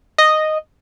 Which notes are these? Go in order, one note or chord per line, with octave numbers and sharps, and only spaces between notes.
D#5